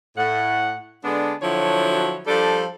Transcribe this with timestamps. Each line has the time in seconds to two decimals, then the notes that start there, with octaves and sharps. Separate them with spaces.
0.17 A2 F#5
1.03 D3 G#3 B3 D4
1.42 D3 F3 F#3 E4 F#4 C#5
2.27 F3 G3 D4 A4